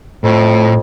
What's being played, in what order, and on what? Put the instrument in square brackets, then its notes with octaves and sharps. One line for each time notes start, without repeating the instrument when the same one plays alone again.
[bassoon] F2 [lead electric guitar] A2